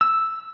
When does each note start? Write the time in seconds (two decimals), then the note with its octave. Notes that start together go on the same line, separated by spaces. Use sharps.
0.01 E6